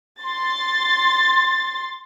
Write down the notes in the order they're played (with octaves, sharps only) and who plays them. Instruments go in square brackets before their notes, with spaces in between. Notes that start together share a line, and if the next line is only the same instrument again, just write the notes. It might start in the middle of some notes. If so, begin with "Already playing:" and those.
[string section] C6 A6